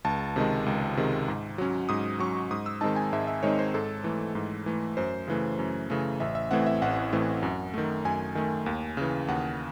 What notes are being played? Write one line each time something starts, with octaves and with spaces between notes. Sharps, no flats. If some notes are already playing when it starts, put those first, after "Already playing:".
C#2 A5
C3 D#3 G#3
C#2
C3 D#3 G#3
G#2
F#3 C#4
G#2 D#6
F#3 C#4 C#6
G#2 D#6
E6
D#3 G#3 C4 D#4 A5
G#5
G#2 E5
E5
D#3 G#3 C4 D#4 C#5
C5
G#2 A4
E3 A3
G#2
E3 A3
F#2 C5
C#3 E3 A3
F#2
C#3 E3 A3
A1 E5
E5
A2 E3 A3 C4 F#5
E5
A1 F#5
A2 E3 A3 C4
F#2
D#3 A3
F#2 G#5
D#3 A3
D#2
C#3 E3
D#2 F#5